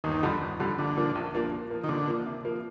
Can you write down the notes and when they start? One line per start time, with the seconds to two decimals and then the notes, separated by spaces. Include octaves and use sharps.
0.04 G1 D#2 D#3
0.23 F2 D3 G3
0.41 G1
0.60 F2 D3 G3
0.78 A#1 D3
0.97 A#2 F3 A#3 D4
1.15 A#1
1.34 A#2 F3 A#3 D4
1.52 A#2
1.70 F3 A#3
1.84 D#3
1.89 A#2 D3
2.08 F3 A#3
2.26 C3
2.45 F3 A#3